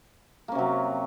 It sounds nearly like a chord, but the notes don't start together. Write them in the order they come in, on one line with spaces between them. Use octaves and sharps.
A#3 C#4 C3 F#3